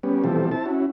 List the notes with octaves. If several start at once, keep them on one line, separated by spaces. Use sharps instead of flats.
G3 B3 C#4
B2 E3 F3 G3 C4 A4
C4 E4 A5
C#4 E4 F#4